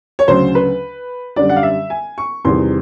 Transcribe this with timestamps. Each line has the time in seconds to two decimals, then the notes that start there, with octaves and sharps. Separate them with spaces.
0.19 C#5
0.28 D2 C#3 F#3 C5
0.55 B4
1.36 F#2 D3 G3 D5
1.49 F#5
1.56 F5
1.63 E5
1.90 G#5
2.18 C#6
2.45 E2 C3 D#3 G3 C6